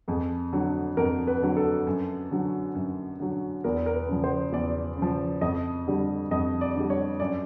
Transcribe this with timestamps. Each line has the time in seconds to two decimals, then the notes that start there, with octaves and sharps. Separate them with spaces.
0.08 F2 G#4
0.53 D3 F#3
0.97 F2 A#4
1.27 B4
1.42 D3 F#3
1.57 A4
1.87 F#2
2.31 D3 F#3
2.75 F#2
3.20 D3 F#3
3.64 E2 A#4
3.86 A#4
3.94 B4
4.08 C#3 F3
4.24 C5
4.52 E2 D5
4.97 C#3
5.02 F3
5.41 F2 D#5
5.87 D3 G3
6.31 F2 D#5
6.61 D5
6.75 D3 G3
6.90 C#5
7.20 F#2 D5